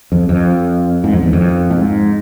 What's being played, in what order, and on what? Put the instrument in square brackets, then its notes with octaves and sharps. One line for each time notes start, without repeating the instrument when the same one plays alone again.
[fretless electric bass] F2
F2
G#2
F2
E2
F2
A2
G#2